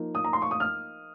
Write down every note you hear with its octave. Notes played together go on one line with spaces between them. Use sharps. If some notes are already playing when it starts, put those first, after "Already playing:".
Already playing: F3 A#3 D#4
D#6
A#5
C6
C#6
D#6
F6